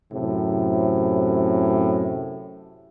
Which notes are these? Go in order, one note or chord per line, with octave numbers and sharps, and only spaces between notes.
F#2 A2 C3